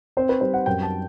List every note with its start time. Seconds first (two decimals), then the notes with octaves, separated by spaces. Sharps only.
0.17 C4 C5
0.29 B4
0.41 G3 C5
0.54 F#5
0.66 F#2 G5
0.83 A5